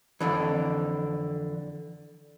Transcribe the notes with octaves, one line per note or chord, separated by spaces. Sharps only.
F2 B2 D3 E3